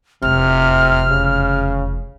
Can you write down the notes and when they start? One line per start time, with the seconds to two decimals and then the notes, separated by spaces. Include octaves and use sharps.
0.22 F1 E2 C3 F6
1.11 C#3